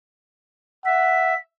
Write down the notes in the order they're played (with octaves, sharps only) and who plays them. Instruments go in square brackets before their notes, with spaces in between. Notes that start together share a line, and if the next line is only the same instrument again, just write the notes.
[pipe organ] E5 [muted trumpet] F#5 [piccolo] B6